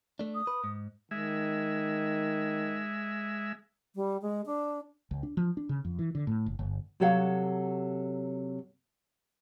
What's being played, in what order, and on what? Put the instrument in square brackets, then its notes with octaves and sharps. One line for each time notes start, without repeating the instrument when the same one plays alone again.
[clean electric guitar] A3 D4
[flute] D#6
[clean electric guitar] B4
G#2
[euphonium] D#3 [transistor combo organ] G#3 E5
[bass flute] G3
G#3
D4
[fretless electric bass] C#2
D4
F3
D4
C#3
F2
E3
D3
A2
F#1
G1
[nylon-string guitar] C3 F#3 A4 C#5 F5 F#5